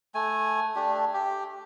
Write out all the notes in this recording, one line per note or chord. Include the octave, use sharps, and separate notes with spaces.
A3 G#5
A3 D4 G4
G4